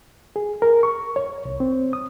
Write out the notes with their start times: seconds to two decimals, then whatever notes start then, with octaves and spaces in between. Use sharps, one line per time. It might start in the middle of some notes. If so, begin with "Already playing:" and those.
0.36 G#4
0.62 A#4
0.83 C#6
1.16 C#5
1.45 C2
1.60 C4
1.93 D#6